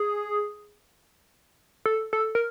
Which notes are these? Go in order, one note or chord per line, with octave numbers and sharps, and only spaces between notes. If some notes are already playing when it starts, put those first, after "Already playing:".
Already playing: G#4
A4
A4
A#4